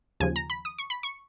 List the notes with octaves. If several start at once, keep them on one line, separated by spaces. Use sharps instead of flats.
D#2 C#3 F3 G#5
A#5
B5
D#6
C#6
B5
C#6